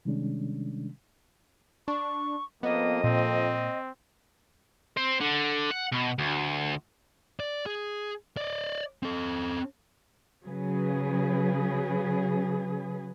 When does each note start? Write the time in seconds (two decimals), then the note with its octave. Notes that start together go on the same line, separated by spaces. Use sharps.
0.05 C3 D#3 G3 G#3 C#4 D4
1.88 D4 C#6
2.63 F2 A#3 B3 D#5
3.04 A#2 C4
4.97 C4 C5
5.21 D3
5.71 F#5
5.92 B2
6.18 D2
7.40 D5
7.66 G#4
8.37 D5 D#5
9.03 C4 A4
10.44 C#3 F#3 G#4 B4